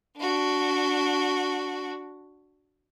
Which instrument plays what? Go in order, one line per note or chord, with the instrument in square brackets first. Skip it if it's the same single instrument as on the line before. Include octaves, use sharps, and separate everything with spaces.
[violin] D4 F#4